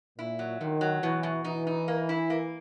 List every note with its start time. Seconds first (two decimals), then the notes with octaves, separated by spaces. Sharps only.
0.18 A#2 E4
0.39 F#3
0.60 A#2 D#3
0.81 F#3
1.03 B2 E3
1.23 B2
1.44 E3 D#4
1.67 D#4
1.88 A#3
2.09 E4
2.30 A#3